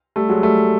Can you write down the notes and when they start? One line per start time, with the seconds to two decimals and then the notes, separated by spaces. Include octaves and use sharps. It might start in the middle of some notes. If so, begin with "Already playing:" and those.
0.16 G3 A3
0.29 F#3 G#3
0.43 G3 A3